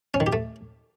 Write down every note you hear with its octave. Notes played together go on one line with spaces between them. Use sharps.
C#4
D#3
G4
A3